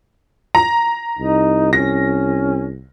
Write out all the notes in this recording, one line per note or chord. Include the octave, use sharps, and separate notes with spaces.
A#5
C2 D#4
C#4 A#6